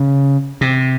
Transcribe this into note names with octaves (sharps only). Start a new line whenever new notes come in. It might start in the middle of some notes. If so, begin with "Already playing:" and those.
Already playing: C#3
C3